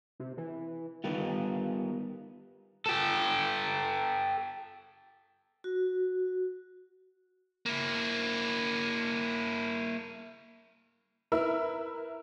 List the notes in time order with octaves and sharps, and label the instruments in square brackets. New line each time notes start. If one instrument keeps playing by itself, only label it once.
[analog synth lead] C3
E3
[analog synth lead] D#3 [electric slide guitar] G3 B3 F4
[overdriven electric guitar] G4 A4
[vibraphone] F#4
[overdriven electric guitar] A#3 E4
[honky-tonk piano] E4 A#4 B4 E5 E6